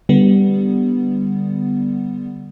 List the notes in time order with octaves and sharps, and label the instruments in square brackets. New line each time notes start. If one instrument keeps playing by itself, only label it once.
[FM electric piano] D3 G3 B3